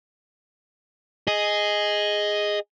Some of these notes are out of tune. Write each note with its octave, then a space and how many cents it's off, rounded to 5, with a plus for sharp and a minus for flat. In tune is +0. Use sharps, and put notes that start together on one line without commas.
G#4 +0 D#5 +0